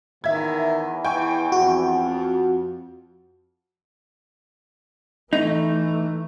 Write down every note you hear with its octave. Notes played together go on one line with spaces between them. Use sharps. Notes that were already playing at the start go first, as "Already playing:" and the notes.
E2 D#3 E5 G#6
E3 G5 G#5 C#6
F2 F#4
E3 A3 D#4